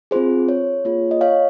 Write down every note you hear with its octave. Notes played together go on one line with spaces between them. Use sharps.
C4 F4 G#4 C5
C#5
A#3 F4 G#4 C#5
D#5
C#5 F5